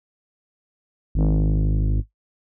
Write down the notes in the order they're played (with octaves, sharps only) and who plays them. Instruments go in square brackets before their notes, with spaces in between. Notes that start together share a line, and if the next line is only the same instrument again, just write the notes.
[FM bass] G#1